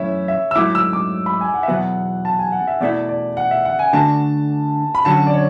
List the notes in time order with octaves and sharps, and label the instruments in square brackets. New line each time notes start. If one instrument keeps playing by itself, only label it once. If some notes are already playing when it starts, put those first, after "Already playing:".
Already playing: [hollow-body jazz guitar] F#2 E3 A3 C#4 E4 [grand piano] C#5 E5
[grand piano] E5
E6
[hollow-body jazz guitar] G#2 F#3 A3 E4 [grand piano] D6
[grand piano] E6
D6
B5
G#5
F#5
E5
[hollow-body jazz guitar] E2 B2 F#3 B3 [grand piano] F#5
[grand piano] A5
G#5
F#5
E5
[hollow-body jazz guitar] E2 B2 A3 E4 [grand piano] D5
[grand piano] D5
F#5
E5
F#5
G#5
[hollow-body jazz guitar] D3 A3 D4 F#4 [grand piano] A5
[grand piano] B5
[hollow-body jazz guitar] D3 F#3 C#4 F#4 [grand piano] A5
[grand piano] D5
C#5